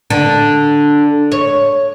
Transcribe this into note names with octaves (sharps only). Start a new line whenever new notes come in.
D3
C#5